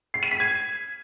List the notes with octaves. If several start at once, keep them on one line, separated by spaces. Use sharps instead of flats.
C7
D#7
B6
G#6